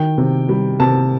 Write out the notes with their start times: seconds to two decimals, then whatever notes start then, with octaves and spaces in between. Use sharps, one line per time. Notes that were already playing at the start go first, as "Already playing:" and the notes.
Already playing: D#3 G5
0.18 C3
0.49 G3
0.80 C3 A5